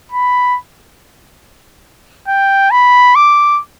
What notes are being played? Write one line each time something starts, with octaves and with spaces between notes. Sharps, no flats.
B5
G5
B5
D6